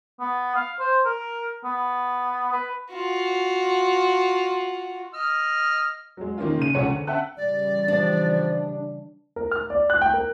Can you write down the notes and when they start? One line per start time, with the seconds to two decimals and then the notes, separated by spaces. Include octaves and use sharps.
0.20 B3
0.55 F5
0.80 C5
1.05 A#4
1.65 B3
2.52 B4
2.92 F4 F#4
5.14 D#5 F6
6.17 F#3 G#3
6.38 D#3 A#3 C#4 F4
6.58 C#3 D#7
6.74 C#2 F3 G#4 C#5 F#5 C#7
6.87 D3
7.07 E5 F#5 G5 A5 F#6
7.37 C#3 E3 G3 D5
7.88 F3 D4
9.36 A#4
9.51 F6
9.70 D5
9.90 F#6
10.01 G5
10.14 A#4